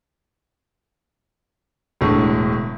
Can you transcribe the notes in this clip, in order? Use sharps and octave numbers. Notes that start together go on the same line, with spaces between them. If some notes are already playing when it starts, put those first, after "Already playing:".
E1 A2 D3